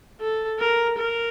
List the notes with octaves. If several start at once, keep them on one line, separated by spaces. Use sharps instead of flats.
A4
A#4
A#4